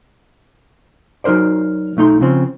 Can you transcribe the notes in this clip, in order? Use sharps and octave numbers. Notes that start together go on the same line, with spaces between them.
F#3 D#4 A#4 C5 D5
B1 A3 D#4 C6
C#3 F3 C4